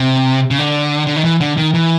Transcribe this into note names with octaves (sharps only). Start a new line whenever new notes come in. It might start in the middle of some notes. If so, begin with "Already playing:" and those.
Already playing: C3
C#3
D3
D3
D#3
E3
D3
D#3
E3